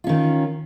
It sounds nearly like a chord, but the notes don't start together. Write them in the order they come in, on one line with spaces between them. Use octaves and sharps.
F4 C#4 D#3